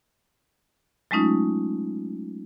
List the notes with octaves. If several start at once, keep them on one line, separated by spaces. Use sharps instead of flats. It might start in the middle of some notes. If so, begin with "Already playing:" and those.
F#3 G#3 A3 C#4 D#4 F4